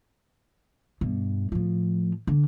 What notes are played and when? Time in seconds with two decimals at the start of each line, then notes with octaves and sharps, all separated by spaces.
1.01 G2 B2
1.52 A2 F3
2.27 D3